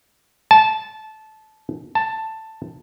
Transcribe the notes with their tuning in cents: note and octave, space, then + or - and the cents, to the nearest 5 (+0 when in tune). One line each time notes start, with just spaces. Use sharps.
A5 -15
A5 +10